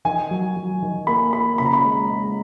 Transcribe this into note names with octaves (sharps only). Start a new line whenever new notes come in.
D#3 G#5
F#3
F#3
D#3
A#3 B5
A#3 B5
C#3 B5
A#5
B5
G#3
G#3